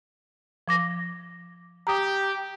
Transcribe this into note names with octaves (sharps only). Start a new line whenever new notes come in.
F3 D6 A#6
G4 A#5 D#6